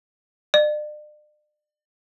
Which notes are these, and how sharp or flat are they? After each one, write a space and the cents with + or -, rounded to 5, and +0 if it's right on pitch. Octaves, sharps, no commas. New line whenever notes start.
D5 +40